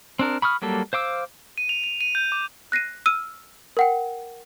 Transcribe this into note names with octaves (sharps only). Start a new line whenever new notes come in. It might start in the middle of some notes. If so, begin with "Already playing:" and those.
C4 D4 A#4
B5 C#6 D#6 F6
F#3 G3 A#3 A4
C5 F5 D6 E6
D#7
F7
F7
D#7
G6
D6
F#6 A#6 C7 D#7
E6 F6 D#7
A#4 F#5 G5